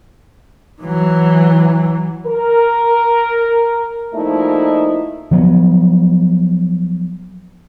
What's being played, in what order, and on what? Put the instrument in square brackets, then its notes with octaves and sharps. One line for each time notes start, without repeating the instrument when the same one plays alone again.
[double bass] E3 F#3
[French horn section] A#4
A#2 F3 A3 D#4 E4
[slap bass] F3 F#3 B3